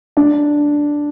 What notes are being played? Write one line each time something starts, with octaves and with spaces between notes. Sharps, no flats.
D4